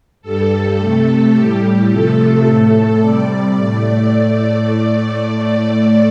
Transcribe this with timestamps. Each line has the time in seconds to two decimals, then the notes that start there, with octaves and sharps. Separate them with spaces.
0.22 G2 G3 A4
0.78 C3 A3
1.34 A2 G3 G4
1.89 C3 F3 A3 A4
2.45 A2 A3
3.00 C3 G3 D5
3.56 A2 A3